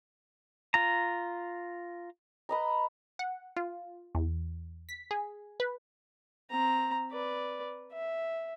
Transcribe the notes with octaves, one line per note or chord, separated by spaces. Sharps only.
F4 A#5
B4 D#5 A#5
F#5
F4
E2
B6
G#4
B4
C4 A#5
B4 D5
E5